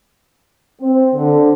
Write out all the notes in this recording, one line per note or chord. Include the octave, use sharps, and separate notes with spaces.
C4
D3